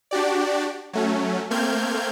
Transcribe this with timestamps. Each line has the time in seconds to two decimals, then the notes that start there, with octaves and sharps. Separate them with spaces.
0.11 D4 F#4 G4 D5
0.93 F#3 A3 C#4
1.50 A3 A#3 C4 F6 G6 G#6